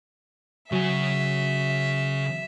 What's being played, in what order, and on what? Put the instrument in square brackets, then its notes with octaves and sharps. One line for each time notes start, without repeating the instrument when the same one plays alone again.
[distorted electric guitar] C#3 G#5 [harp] F#3 [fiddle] E5